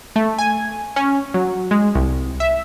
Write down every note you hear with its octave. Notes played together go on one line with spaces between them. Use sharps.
A3
G#5
C#4
F#3
G#3
C2
E5